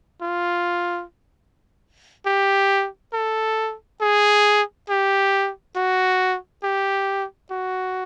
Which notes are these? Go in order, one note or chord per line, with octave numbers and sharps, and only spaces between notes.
F4
G4
A4
G#4
G4
F#4
G4
F#4